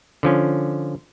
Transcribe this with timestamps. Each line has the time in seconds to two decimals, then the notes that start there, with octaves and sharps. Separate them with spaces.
0.23 D3 F3 C#4